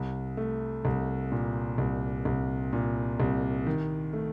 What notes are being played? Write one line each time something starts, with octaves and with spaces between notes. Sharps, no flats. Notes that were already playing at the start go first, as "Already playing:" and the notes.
Already playing: C2
A3
C2
A#2
C2
C2
A#2
C2
D#3
A3